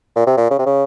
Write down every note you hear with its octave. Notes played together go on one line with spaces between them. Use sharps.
A#2
C3
A#2
C#3
C3
C#3